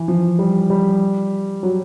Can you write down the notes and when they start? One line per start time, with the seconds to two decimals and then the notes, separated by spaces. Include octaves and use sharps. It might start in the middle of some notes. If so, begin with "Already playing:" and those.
Already playing: E3
0.08 F3
0.39 G3
0.70 G3
1.63 F#3